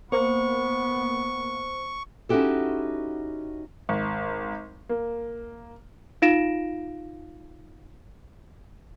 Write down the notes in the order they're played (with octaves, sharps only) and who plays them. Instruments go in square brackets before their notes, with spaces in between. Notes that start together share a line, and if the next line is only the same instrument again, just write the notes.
[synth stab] A#3 [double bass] B3 [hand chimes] C5 [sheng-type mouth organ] C#6
[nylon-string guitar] C#4 D#4 E4 F#4 G4 A4
[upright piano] G#1
A#3
[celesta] D#4 F4 F5 A#6 D7 E7